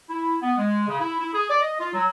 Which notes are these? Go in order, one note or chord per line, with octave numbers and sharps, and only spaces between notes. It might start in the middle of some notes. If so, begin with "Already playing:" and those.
E4
B3
G#3
C#3
E4
E4
G#4
D5
D#5
F4
F#3